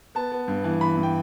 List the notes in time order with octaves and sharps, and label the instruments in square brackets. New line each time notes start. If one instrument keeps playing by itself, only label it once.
[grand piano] B3 A5
B3
G2
E3
E3 B5
G2
G5